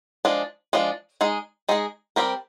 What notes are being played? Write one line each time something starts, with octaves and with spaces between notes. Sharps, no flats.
F3 G#3 D4
F3 G#3 D4
G#3 D#4 G#4
G#3 D#4 G#4
G3 C4 G4 A#4